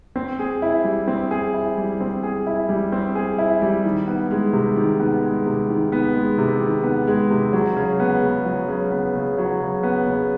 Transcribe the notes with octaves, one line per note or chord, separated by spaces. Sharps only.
C4
G#4
E4
G3
C4
G#4
E4
G3
C4
G#4
E4
G3
C4
G#4
E4
G3
D#3
B3
G#3
C3
D#3
B3
G#3
C3
D#3
B3
G#3
C3
D#3
B3
G#3
C3
F#3
C#3
B3
C#3
F#3
C#3
B3
C#3
F#3
C#3
B3
C#3